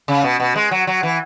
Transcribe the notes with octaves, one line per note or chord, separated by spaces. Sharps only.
C#3
B2
B2
G#3
F#3
F#3
E3